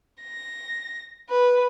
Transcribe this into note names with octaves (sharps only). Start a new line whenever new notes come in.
A#6
B4